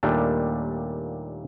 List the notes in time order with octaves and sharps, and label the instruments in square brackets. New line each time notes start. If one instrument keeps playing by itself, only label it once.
[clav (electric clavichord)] D#2 A#2 G3 A3 D4